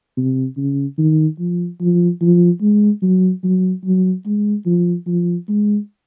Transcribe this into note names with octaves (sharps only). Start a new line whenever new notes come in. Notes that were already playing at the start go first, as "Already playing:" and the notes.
C3
C#3
D#3
F3
F3
F3
G#3
F#3
F#3
F#3
G#3
F3
F3
G#3